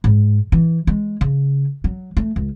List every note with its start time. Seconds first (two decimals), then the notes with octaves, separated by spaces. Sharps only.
0.04 G#2
0.52 E3
0.87 G#3
1.21 C#3
1.84 F#3
2.17 A3
2.36 C#2